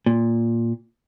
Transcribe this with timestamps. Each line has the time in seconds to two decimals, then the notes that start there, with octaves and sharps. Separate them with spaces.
0.06 A#2